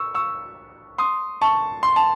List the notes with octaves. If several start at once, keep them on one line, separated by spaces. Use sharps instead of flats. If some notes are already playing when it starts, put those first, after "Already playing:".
Already playing: C#6 E6
C#6 E6
C6 D#6
A5 C#6
C6
A5